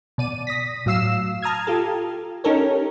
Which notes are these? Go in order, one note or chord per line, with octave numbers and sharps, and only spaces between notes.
B2 D5 D#7
D#6 A#6 B6
A2 F#3 F5 E6 C7 E7
A5 A#5 D#6 F6 G#6
F4 G4 A4
C#4 D#4 G4 A4 A#4 C#5